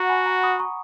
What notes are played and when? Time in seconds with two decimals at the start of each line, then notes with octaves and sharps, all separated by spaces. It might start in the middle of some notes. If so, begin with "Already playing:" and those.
Already playing: F#4 F#5 A#5
0.09 G#5 B5
0.26 F#5 A#5
0.43 B5 D#6
0.59 A#5 C#6